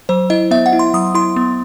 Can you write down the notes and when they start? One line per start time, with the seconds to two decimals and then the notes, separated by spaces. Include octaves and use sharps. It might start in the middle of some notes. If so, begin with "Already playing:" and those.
0.09 F#3 C5
0.30 E4 D#5
0.51 B3 E5
0.66 F#5
0.73 E4
0.79 C6
0.94 F#3 D#6
1.15 E4 C6
1.36 B3